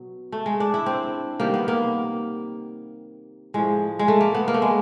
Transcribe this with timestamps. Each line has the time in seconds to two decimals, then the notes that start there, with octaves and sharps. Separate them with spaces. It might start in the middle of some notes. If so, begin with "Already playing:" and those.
Already playing: B2 F#3
0.32 A3
0.46 G#3
0.60 D4
0.74 E4
0.86 C4
1.40 C3 D#3 G3 A#3
1.54 B3
1.68 A#3
3.54 A2 F3 G#3
3.99 G#3
4.08 A3
4.21 A#3
4.35 B3
4.48 A#3
4.54 A3
4.62 G#3